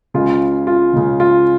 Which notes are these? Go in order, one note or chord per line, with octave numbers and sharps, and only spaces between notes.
C#2 C#3 F4
F4
C#2 C#3
F4